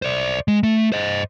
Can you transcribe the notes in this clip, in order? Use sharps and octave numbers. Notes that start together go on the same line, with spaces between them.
C5 D5
G#3
A3
C5 D#5